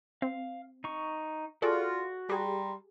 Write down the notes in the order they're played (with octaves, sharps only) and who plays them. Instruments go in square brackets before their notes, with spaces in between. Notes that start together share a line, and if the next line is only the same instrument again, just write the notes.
[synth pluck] C4 [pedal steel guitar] F5
[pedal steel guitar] D#4 C#6
[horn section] F4 [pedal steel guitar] F#4 [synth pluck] G#4 A4 D5
[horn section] G3 A#5 C6 [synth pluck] G4 G#4